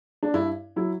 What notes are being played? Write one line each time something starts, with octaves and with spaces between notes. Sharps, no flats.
D4
G2 E4
F#3 E4